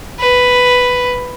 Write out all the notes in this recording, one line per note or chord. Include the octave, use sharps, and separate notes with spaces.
B4